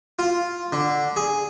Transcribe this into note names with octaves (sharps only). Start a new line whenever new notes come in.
F4
D3
G#4